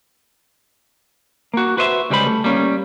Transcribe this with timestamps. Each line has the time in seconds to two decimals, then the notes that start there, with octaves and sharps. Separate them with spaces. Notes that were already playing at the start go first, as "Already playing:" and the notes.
1.54 A#3 F#4
1.77 F#4 B4 C5 D#5 E5
2.10 C#2 G3 G#3 C5 B5
2.27 A3
2.44 G3 A#3 C#4